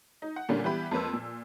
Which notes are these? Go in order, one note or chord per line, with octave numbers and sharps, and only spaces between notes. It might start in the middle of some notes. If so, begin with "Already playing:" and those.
D#4
F#5
A#2 D3 G3 A#3 C#4 D4
E3 G3 B3 G4 B5
F2 A#3 B4 E6
A#2